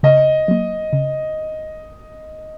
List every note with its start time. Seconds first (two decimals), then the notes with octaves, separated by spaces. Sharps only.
0.03 C#3 D#5
0.48 F#3 A#3
0.93 C#3